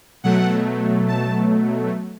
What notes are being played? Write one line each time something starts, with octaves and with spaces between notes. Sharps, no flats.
B2 F#3 A3 F#5
A5